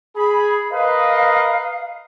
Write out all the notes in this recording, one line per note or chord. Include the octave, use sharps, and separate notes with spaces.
G#4 B5
A#4 B4 D#5 F5